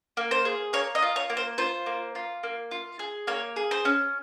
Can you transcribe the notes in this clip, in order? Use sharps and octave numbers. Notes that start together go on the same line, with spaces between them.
A#3
C5
G#4
A#3 C#5
D#5
F4
C#5
A#3
C5
F4 C5
A#3
F4
A#3
F4
G#4
A#3 C#5
G#4
C5
C#4